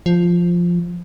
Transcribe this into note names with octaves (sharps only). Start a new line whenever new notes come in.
F3